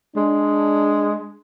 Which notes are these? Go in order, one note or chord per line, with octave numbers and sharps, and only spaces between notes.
G#3 D4